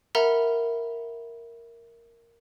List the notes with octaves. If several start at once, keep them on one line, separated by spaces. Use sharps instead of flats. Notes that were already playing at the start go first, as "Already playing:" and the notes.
A#4 E5 F#5 A#5 B5